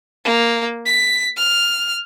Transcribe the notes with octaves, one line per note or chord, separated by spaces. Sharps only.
A#3
B6
F6